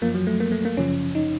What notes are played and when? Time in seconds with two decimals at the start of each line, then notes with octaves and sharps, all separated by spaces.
0.02 F#2 F3 A#3
0.15 F#3
0.27 A3
0.40 A#3
0.52 A3
0.65 A#3
0.77 F#2 C#3 F3 C#4
1.15 D#4